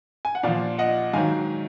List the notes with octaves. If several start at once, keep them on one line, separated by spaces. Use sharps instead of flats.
G#5
F#5
A#2 F3 D5 F5
D#5 F#5
G#2 D#3 F#3 F5 G#5